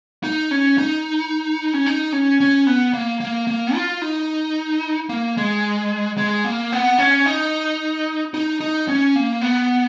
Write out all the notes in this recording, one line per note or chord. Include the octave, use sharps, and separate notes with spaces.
D#4
C#4
D#4
C#4
D#4
C#4
C#4
B3
A#3
A#3
A#3
F4
D#4
A#3
G#3
G#3
A#3
B3
C#4
D#4
D#4
D#4
C#4
A#3
B3